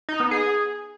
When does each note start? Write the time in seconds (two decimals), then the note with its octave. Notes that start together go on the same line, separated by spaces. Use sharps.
0.09 D#4
0.20 B3
0.31 G#4